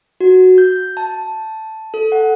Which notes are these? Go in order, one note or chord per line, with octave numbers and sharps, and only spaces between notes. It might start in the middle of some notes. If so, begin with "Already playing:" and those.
F#4
G6
A5
A4
F#5